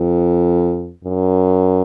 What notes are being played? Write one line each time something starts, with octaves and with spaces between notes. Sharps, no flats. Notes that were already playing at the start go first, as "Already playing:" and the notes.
Already playing: F2
F#2